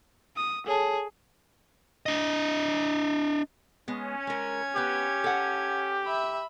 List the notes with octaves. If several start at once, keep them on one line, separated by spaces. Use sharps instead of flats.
D#6
G#4 A4 C#5 A5
D4 D#5
G#3 B3 C#4
G#3 A#4 G#6
B3 G4 B4
A4 F#5
E5 B5